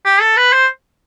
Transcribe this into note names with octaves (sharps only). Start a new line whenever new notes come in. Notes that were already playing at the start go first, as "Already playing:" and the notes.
G4
A4
B4
C5